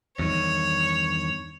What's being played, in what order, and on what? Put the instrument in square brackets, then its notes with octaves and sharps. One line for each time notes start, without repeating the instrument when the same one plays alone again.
[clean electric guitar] E2 G2 D#3 [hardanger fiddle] C#5